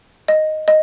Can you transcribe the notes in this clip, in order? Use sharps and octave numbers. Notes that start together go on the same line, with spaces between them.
D#5
D#5